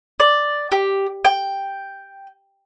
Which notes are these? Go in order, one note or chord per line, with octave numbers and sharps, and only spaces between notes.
D5
G4
G5